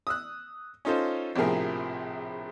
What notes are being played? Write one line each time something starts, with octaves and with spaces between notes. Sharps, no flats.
D#6 E6 F#6
C#4 D#4 F4 A4 C5
A#1 A2 C3 F3 G#4 A#4